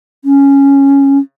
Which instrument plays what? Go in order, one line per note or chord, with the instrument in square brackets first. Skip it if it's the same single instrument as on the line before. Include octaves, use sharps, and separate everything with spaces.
[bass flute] C#4